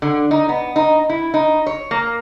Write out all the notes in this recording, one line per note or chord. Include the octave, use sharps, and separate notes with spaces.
D3
D#4
B3
D#4
E4
D#4
C#5
A#3